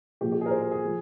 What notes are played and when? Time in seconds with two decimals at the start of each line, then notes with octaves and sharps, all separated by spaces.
0.21 A#2 F3 G4
0.32 G4
0.41 G#4
0.46 A#4
0.51 C5
0.61 A#4
0.71 G#4
0.85 F3